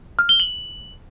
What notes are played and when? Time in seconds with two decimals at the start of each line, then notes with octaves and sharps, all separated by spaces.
0.19 F6
0.29 G7
0.40 F#7